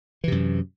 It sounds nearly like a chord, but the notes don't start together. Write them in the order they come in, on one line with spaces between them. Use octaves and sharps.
E3 C3 F#2